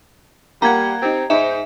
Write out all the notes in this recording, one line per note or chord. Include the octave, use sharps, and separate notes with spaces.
G3 A#3 F#5 A#5 G#6
C4 D#4 G4
G#2 D#4 C5 E5